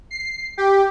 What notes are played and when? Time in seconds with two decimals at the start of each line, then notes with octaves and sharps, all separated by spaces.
0.11 C7
0.58 G4